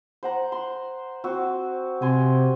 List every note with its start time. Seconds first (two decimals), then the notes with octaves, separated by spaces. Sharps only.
0.23 C5 F#5 A#5
0.52 C6
1.24 C4 F#4
2.02 C3 G#5 C6